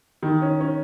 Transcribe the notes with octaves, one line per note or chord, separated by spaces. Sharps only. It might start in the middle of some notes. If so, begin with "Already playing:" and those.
D#3
C#4
C#4